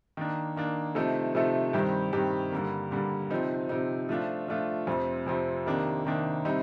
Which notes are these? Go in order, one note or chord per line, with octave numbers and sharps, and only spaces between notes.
D#3 A#3 D4
D#3 A#3 D4
C3 F3 A3 D#4 A4
C3 F3 A3 D#4 A4
G2 D#3 G3 C4 G4
G2 D#3 G3 C4 G4
G2 D3 G3 A#3
G2 D3 G3 A#3
C3 F3 C4 D#4
C3 F3 C4 D#4
F3 A3 D4 F4
F3 A3 D4 F4
F2 C3 F3 C4
F2 C3 F3 C4
C3 D#3 A#3 D4
C3 D#3 A#3 D4
C3 G3 C4 D#4